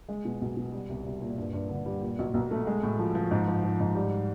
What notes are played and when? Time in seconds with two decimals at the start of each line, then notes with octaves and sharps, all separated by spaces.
0.08 G#3
0.25 B2
0.41 B1
0.57 B2
0.72 G3
0.89 C2
1.05 C2
1.22 A#2
1.37 G2
1.53 G2
1.69 D3
1.86 G3
2.02 A#2
2.19 B1
2.34 B1
2.51 A3
2.67 G#3
2.83 A2
2.98 F3
3.15 F3
3.31 G#2
3.47 F3
3.64 F3
3.80 G#2
3.95 G3